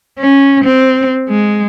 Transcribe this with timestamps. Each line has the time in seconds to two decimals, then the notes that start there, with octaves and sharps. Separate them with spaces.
0.19 C#4
0.64 C4
1.28 G#3